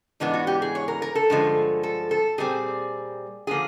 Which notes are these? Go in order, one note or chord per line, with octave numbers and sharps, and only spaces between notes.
G#2 E3 G#3 B3 D4
F#4
G4
G#4
C#5
A#4
A#4
A4
G2 D3 F3 G#3
A4
A4
A#2 G3 C4 G#4
D3 F3 A#3 G#4